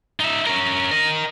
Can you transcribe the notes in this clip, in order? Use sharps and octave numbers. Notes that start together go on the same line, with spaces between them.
D#4 E5
C#4 A#4
A#4 D#5